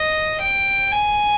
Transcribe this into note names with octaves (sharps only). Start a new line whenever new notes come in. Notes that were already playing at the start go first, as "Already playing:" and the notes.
Already playing: D#5
G5
G#5